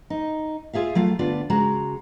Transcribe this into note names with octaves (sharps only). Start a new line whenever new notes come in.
D#4
F4 G#4 E5 F5
F#3 A3 F4 F5
D2 B3 D4 F4 D5
C#3 G#3 F#4 A#5